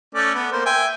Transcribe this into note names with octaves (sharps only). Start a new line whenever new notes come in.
A3 C#4 D5
B3
A#3 C5
E5 G5 G#5